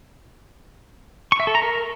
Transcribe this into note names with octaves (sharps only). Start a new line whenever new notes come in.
C#6
E5
A4
A#5
A#4